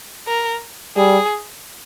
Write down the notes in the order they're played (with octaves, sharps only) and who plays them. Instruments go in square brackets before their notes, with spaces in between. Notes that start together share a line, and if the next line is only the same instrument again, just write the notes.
[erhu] A#4
[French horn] G3 [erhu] G#4